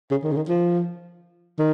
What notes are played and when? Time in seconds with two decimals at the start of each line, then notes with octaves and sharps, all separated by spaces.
0.11 C#3
0.23 D#3
0.32 C#3
0.36 D#3
0.48 F3
1.58 D#3